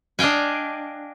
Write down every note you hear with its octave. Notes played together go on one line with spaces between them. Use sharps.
D4 D#5 F5 G5 G#5